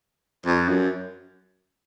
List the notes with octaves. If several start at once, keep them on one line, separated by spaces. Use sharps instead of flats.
F2
F#2